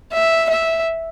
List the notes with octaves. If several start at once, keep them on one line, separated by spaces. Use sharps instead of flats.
E5
E5